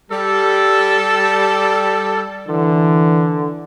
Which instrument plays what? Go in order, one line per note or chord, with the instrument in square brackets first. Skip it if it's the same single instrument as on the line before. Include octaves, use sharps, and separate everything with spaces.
[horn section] G3 A4
[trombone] D3 [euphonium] E3